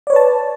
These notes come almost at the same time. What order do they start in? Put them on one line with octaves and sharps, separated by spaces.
D5 C#5 B4 A5